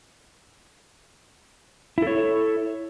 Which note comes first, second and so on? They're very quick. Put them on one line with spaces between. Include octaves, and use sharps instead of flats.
E4 A4 C#5